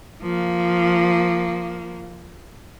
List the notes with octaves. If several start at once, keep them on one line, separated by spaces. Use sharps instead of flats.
F3 A#3